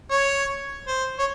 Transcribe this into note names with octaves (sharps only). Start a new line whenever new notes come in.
C#5
C5
C#5